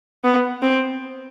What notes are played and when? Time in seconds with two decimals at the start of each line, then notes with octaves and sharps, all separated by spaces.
0.24 B3
0.62 C4